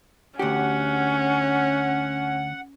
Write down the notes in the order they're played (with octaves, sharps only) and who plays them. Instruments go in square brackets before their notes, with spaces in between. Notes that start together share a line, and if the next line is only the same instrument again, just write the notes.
[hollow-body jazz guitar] D2 G4 [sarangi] C#4 [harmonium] F#5